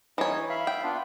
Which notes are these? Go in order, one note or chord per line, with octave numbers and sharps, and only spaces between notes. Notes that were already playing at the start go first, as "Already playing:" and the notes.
E3 D#4 C#5 D#5
E5 F5 B5
G5
B3 D4 F4